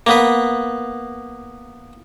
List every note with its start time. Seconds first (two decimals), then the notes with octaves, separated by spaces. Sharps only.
0.07 A#3 B3 B4